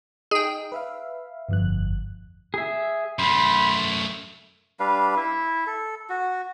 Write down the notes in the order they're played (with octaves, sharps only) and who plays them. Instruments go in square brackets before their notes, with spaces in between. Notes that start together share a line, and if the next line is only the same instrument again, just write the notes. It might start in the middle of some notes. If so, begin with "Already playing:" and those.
[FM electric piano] D#4 [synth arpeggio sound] G#4 G5
[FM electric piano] B4 E5 F5
G1 F2 F#6
[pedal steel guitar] G#4 E5
[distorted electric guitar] F#2 A3 [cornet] B5 [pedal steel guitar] C6
[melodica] G3 D4 B4 F5
E4 E5
A4
F#4